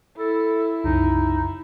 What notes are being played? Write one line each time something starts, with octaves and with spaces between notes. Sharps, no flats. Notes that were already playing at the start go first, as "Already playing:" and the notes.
E4 A4
C2 F#2 C#3 D#4